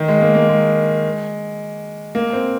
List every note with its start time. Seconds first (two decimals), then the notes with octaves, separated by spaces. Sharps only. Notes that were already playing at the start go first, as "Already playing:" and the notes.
Already playing: D#3
0.08 G#3
0.21 A#3
0.35 A#3
0.49 G#3
2.15 A#3
2.33 C4